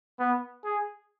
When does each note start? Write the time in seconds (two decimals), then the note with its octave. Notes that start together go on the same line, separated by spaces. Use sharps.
0.19 B3
0.64 G#4